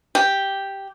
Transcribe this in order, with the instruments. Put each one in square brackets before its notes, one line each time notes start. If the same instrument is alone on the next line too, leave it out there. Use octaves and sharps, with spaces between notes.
[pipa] G4